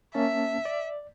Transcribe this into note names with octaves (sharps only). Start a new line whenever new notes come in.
A#3 C#4 E5 A5
D5